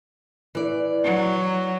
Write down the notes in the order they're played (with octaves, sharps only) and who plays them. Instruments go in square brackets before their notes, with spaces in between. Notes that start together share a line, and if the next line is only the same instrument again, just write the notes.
[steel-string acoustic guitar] E3 D5
[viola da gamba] F#3